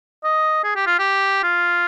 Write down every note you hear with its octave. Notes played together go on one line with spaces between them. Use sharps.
D#5
G#4
G4
F4
G4
F4